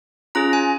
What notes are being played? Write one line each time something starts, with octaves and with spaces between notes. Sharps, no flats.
C#4 F4 G#4 A#5
G#5